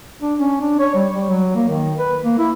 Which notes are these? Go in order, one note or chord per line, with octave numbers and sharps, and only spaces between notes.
D4
C#4
D4
C#5
G3
G3
F#3
A#3
D#3
B4
A#3
E4